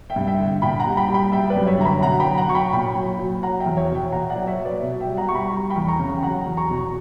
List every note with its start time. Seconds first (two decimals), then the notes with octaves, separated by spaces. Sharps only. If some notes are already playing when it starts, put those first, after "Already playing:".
0.10 E5 G5
0.16 G2
0.27 E5 G5
0.39 D3
0.62 A#2 G5 B5
0.80 F#5 A#5
0.86 G3
0.97 G5 B5
1.09 G3
1.14 G5 B5
1.32 G3 E5 G5
1.50 B4 D5
1.56 F#2
1.67 C#5 E5
1.79 D3 A#5
1.84 G5 B5
2.02 B2 F#5 A#5
2.20 G5 B5
2.25 F#3
2.38 F#5 A#5
2.49 F#3 C#6
2.55 G5 B5
2.73 A#2 G5 B5
2.95 F#3
3.19 F#3
3.42 F#3 F#5 A#5
3.60 E5 G5
3.66 E2
3.77 C#5 E5
3.89 B2
3.95 E5 G5
4.12 A#2 F#5 A#5
4.30 D5 F#5
4.36 F#3
4.47 C#5 E5
4.59 F#3
4.65 B4 D5
4.82 B2
5.01 E5 G5
5.06 G3
5.17 F#5 A#5
5.28 G3 C#6
5.35 G5 B5
5.52 G3 A#5 C#6
5.70 G5 B5
5.76 E2
5.88 A#5 C#6
5.99 C#3
6.17 G5
6.23 F#3 F#5 A#5
6.46 E2
6.57 A#5 C#6
6.69 B2